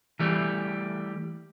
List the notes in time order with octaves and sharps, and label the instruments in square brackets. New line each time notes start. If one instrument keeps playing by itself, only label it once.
[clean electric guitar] E3 G3 A3